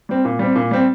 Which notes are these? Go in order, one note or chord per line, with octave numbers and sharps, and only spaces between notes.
G3 C4
A#2
G3 C4
A#2
G3 C4